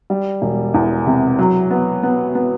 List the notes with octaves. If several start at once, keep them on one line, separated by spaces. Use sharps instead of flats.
G3
E1
E2
C3
F#3
B3
B3
B3